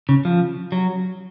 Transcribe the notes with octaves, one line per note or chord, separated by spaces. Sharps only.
C#3
F3
F#3